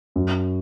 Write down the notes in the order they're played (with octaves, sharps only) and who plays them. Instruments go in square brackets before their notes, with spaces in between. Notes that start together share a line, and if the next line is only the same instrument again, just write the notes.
[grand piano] F#2